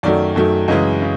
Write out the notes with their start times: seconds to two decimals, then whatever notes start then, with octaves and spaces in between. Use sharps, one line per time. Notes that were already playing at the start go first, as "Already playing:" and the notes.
0.03 F#2 D#3 F#3 A3 D5
0.36 F#2 D#3 F#3 A3
0.68 F#2 C#3 E3 G#3 D#5
1.02 C#3